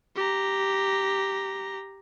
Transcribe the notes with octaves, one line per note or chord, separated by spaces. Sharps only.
G4 A#5